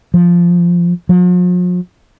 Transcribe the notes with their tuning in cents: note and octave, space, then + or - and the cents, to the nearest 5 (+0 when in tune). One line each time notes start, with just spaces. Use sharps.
F3 -5
F3 +45